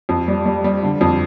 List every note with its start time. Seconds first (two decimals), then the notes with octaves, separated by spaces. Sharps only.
0.09 F2
0.28 G3
0.46 G3
0.64 G3
0.83 D3
1.01 F2